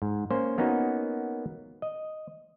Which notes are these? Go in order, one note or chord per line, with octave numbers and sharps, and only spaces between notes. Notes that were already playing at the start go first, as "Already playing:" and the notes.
G#2
A#3 C#4 C5
A#3 B3 C#4 D#4 F#4
D#5